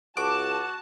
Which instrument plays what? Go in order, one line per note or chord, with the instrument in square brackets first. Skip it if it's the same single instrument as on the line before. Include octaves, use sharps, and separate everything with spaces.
[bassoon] C#2 [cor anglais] F#4 [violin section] A5 [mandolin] D6